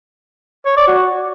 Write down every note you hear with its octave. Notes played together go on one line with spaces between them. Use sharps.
C#5
D5
F#4